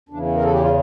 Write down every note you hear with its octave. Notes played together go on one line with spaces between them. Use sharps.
E2 C#3 E3 D4
A#4
A4
G4
F4